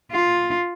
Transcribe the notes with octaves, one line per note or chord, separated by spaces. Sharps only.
F4